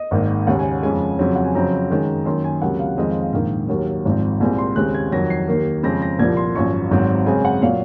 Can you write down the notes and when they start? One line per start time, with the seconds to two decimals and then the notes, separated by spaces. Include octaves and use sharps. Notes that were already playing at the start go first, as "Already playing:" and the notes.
Already playing: D#5
0.11 G#1 G#2 D#3 A#3
0.47 D#2 C#3 G#3 F#5
0.59 G#5
0.83 F2 C#3 G#3 G#5
1.19 F2 C#3 F#3 C4
1.36 F#5
1.45 G#5
1.55 F2 C#3 F#3 C4 A#5
1.90 F#2 D#3 G#3
2.26 F#2 D#3 A#3 C6
2.44 G#5
2.62 C#2 C3 F#3 A#3 F#5
2.79 F5
2.97 F2 D#3 G#3 C4 D#5
3.10 F5
3.21 F5
3.33 A#1 G#2 D#3 A#3 F5
3.69 D#2 D#3 F#3 A#3
4.05 G#1 G#2 F3 C4
4.40 C2 A#2 G#3 C4 G#5
4.58 C6
4.76 D#2 C#3 G#3 C4 F#6
4.95 G#6
5.12 F2 D#3 F#3 A#6
5.30 C7
5.48 D#2 D#3 A#3
5.83 F2 C#3 G#3 C4 A#6
6.02 A#6
6.19 C2 A#2 F3 A#3 G#6
6.37 C6
6.55 G#1 F#2 F3 C#6
6.91 G#1 G#2 F#3 C4
7.26 F#2 C#3 G#3 C4 G#5
7.45 F#5
7.62 A#2 F#3 F5